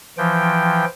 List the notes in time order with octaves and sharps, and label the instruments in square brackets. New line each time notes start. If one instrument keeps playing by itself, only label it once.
[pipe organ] E3 F3 G5